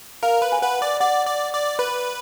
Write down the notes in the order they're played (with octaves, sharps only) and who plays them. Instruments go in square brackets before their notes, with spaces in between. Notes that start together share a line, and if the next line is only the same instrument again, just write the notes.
[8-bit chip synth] A#4 [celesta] F5
[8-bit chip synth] B4
[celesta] G#5
[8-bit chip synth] B4 [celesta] F#5
[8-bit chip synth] D5
[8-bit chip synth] D5 [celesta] F#5
[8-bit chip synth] D5
D5
B4